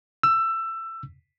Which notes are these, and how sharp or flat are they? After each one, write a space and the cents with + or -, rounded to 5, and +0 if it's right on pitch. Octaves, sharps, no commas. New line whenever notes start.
E6 +20